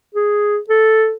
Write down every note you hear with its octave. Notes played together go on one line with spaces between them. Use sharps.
G#4
A4